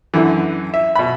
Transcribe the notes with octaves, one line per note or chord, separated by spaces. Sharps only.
F#2 D3 E3
E5
B2 B5